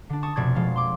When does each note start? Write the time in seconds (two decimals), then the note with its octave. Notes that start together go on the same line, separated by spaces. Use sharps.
0.09 D3 D4
0.23 A5 C#6 D#6
0.36 F1 B2 D5 C#6 G#6
0.55 B2 F3 G#3 F5
0.76 C6 D6